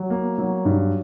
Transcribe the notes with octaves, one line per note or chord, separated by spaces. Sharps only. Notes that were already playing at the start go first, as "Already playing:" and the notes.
Already playing: F#3
A#3
F#3
G2